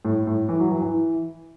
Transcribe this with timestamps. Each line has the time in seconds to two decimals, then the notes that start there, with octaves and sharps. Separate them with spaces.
0.05 A2
0.27 A2
0.49 E3
0.60 F#3
0.71 E3
0.81 E3